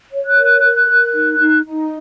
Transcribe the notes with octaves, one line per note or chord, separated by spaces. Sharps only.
C#5
F#6
A#4
A#4
A#4
D#4
D#4
D#4